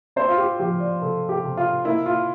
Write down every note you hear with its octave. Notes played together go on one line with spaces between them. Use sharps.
C4 C5
F4
G4
F3 G4
D5
C3 A4
G4
C3
F4
A#3 E4
F4